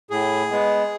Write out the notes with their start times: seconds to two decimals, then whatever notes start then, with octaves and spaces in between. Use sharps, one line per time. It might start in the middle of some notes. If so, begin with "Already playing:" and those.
0.11 A2 G#4
0.51 G#3 B3